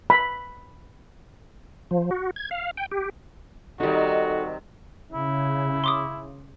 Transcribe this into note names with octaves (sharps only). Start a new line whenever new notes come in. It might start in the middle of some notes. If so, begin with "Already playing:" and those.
B5
F3
F#4
G#6
F5
G5
G4
C3 D#3 G3 D#4 F#4 A4
C#3 E4
C6 D6 D#6